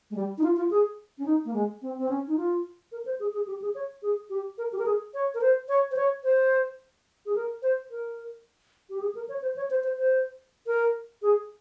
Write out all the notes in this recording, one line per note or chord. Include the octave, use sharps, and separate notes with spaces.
G#3
G3
D#4
F4
F4
G#4
C#4
D#4
A#3
G#3
C4
C4
C#4
D#4
F4
A#4
C5
G#4
G#4
G4
G#4
C#5
G#4
G4
A#4
G4
A#4
G#4
C#5
A#4
C5
C#5
C5
C#5
C5
G#4
A#4
C5
A#4
G4
G#4
A#4
C#5
C5
C#5
C5
C5
C5
A#4
G#4